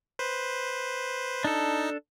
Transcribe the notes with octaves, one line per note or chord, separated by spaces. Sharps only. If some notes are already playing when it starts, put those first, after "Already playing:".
B4 C5
D4 D#4 A4